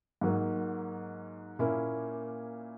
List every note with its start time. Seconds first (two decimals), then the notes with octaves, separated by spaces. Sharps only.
0.21 G#2 F#3 A#3
1.59 A#2 A#3 C#4 E4